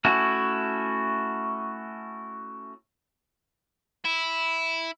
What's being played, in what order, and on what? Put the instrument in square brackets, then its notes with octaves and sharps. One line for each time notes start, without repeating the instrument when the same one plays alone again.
[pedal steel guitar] A3 C#4 E4 F#4
[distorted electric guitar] E4